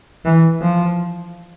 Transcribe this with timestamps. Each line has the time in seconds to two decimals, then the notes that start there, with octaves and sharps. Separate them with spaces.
0.25 E3
0.62 F3